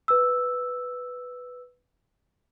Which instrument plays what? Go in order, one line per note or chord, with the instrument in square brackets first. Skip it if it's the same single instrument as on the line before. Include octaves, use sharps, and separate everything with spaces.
[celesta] B4 E6